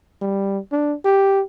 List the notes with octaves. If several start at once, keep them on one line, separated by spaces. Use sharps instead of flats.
G3
D4
G4